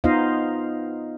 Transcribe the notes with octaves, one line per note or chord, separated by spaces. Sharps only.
B3 D#4 F4 C5 D#5 F5